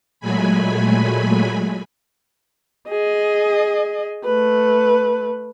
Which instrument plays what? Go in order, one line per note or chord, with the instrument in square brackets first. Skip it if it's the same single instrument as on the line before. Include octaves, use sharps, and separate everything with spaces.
[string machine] A#2 F#3 G#3 A3 G#5 B5
[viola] G#4 D#5
A3 B4